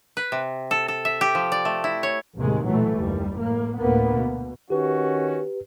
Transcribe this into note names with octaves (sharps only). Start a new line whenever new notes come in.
B4
C3
A4
A4
E5
G4
F3
D5
A3
E4
C#5
A1 D#2 C3 D#3 G#3
B1 A#2 E3 F#3 A3
F#1 D#2 G3
A2 A#3
D2 A2 A#3 B3
B2
D#3 C#4 F#4 G4 B4